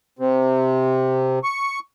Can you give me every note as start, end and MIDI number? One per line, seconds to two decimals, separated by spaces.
0.19 1.39 48
1.43 1.79 85